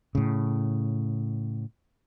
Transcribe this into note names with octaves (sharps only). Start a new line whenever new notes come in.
A2 C#3